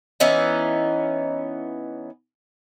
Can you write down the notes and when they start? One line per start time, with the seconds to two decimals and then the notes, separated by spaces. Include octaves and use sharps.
0.20 E3 B3 C#4 D#4